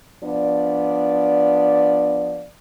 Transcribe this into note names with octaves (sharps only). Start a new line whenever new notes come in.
F3 B3 D4 D5